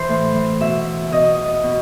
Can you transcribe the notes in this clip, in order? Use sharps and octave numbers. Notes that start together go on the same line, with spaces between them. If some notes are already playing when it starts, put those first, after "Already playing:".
Already playing: E3 C5
A2
E3
B2 E5
B2 D#5
B2